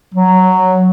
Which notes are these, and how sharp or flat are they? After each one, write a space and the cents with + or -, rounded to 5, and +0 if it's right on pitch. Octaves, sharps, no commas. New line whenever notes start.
F#3 +0